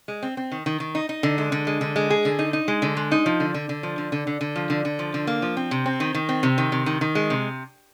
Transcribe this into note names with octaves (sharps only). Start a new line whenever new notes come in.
G#3
C4
C4
D#3
D#3
D#3
D#4
D#4
D3
G#3
D3
G#3
D3
G#3
G#4
D3
D#4
D#4
G#3
D3
G#3
D#4
F3
D3
D3
D3
F3
D3
D3
D3
D3
F3
D3
D3
F3
D3
A#3
F3
C4
C3
C4
D#3
D#3
C4
C3
D#3
C3
D#3
D#3
G#3
C3